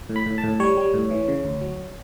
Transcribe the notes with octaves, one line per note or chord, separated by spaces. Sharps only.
A2
B5
A2
A5
A2
G3 C#5
G3
A2
E3
C#3
D2
F#3